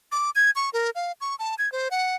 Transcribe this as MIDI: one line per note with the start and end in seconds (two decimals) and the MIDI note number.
0.12 0.30 86
0.35 0.51 92
0.55 0.70 85
0.73 0.90 70
0.95 1.12 77
1.21 1.35 85
1.39 1.55 81
1.58 1.71 92
1.72 1.88 72
1.91 2.16 78